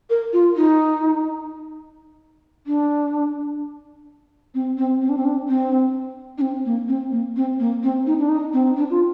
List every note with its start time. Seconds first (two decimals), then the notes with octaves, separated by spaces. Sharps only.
0.10 A#4
0.33 F4
0.56 D#4
2.67 D4
4.54 C4
4.78 C4
5.01 C4
5.09 D4
5.18 C4
5.25 D4
5.49 C4
6.38 D4
6.41 C4
6.66 A#3
6.88 C4
7.12 A#3
7.36 C4
7.60 A#3
7.83 C4
8.07 D#4
8.19 D4
8.29 D#4
8.53 C4
8.77 D4
8.90 F4